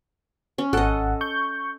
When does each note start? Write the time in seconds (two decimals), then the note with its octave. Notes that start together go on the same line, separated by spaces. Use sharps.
0.58 C#4
0.73 G#1 A4 D#5 F#5
1.21 C#6 G6